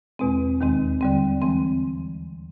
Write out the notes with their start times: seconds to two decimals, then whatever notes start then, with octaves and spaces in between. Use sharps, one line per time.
0.19 E2 B2 G#3 C4
0.61 D#2 D#3 G#3 C4
1.01 D3 G3 C4
1.42 E3 G#3 C4